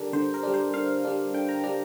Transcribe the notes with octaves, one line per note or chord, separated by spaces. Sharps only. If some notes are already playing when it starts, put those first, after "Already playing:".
Already playing: D3 G3 D4 A#4
D3 C5
A#4
G3 D4
C5
D3 F5
G3 D4
D3 G5
A#5
G3 D4 A#5